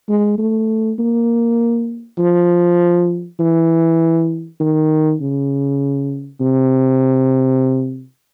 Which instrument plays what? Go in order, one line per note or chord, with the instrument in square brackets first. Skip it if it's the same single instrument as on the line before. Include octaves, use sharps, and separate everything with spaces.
[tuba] G#3
A3
A#3
F3
E3
D#3
C#3
C3